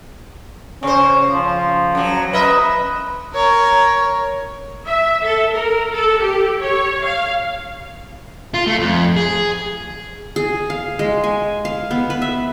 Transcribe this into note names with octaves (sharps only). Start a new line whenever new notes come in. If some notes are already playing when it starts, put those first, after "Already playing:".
C#3 C#4 C5
F3
F#2 F#3
A#4 B4 D#5 E5
A#4 C#5
E5
A4
A#4
A4
G4
C#5
F5
F4
A3
F2
G#4
G#4
F5
G#3
G#5
F5
B3
B4
E5